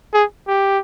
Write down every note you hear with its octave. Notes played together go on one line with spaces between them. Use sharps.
G#4
G4